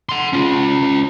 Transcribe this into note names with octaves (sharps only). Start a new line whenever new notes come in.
F#5 C6
C#4 F4